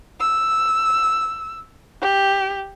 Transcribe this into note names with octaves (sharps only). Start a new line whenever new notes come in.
E6
G4